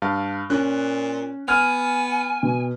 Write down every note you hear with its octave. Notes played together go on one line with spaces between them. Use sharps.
G2 F5 A5
A#2 C#4 F#6
B3 G#5 F6 G#6 F7
B2